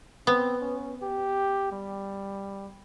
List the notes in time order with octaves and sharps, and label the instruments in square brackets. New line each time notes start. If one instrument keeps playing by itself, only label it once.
[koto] B3 [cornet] C4
[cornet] C#4
G4
G3